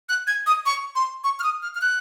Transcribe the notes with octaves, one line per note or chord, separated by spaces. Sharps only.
F#6
G#6
D#6
C#6
C6
C#6
F6
D#6
F6
F6
F#6